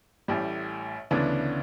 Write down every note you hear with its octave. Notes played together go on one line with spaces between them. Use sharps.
A1 A2 G3
D2 C#3 E3 B3 D4